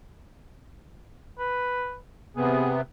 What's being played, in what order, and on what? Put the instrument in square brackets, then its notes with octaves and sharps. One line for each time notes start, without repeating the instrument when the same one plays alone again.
[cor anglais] B4
[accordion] C3 B3 [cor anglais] G#4